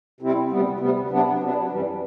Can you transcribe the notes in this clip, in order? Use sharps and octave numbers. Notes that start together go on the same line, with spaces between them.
C3 G3 C4 E4
D2 C3 G3 B3
D2 C3 G3 B3
C3 F#3 B3 D4
C3 F#3 B3 D4
F#2 E3 G3